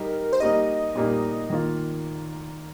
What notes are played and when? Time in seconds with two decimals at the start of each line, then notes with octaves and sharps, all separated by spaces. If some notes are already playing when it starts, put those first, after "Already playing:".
Already playing: G3 D#4 G4 A#4
0.33 C5
0.40 G3 A#3 D#4 D#5
0.95 A#2 G3 A#3 D#4
1.50 D#3 A#3 F4